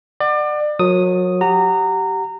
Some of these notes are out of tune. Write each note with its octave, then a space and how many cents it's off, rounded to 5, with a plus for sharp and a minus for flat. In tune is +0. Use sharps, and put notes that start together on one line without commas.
D5 +30 F#5 +0
F#3 -30 A#4 +0 D#6 +0
G4 -15 F#5 +0 A#5 -20